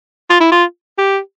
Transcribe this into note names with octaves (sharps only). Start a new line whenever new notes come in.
F4
E4
F4
G4